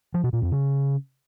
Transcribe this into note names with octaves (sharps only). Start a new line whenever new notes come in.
F3
B2
A#2
F2
C#3